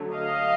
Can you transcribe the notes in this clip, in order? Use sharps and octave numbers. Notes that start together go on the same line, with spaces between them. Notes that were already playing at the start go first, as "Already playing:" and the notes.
Already playing: D3 F#3 A3
D#5 F5